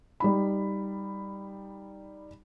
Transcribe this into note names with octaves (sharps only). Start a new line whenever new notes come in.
G3 D#4 B5